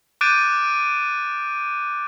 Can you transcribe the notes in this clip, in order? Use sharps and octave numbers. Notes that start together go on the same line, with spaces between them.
D6 F#6 G6 A6 D7 D#7